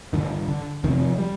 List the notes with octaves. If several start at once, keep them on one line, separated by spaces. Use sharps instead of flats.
G2 D3 D#3
D3
F2 C3 D#3
F3
G3